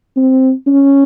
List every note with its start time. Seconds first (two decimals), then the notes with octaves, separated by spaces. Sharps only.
0.17 C4
0.67 C#4